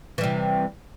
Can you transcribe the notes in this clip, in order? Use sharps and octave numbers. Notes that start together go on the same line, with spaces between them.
C3 E3 G3